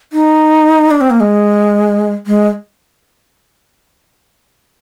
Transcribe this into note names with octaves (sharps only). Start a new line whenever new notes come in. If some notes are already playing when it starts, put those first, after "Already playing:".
D#4
D4
C4
A#3
G#3
G#3